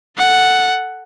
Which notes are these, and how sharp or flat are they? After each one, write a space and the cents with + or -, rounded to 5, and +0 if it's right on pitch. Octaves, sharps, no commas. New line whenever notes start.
A4 +0 F#5 +0